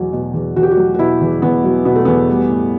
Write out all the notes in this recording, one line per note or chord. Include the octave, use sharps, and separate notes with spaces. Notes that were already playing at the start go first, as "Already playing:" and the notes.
Already playing: E2 B2 F#3
B2
E2
E2 F#4
G4
F#4
F#3
F#4
B2 E4
E2
E2 B3
F#3
B2 B3
A3
E2 B3
G3
A2